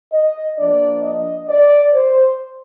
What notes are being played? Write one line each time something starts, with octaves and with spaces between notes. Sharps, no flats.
D#5
F3 A#3 D4 D5
D#5
D5
C5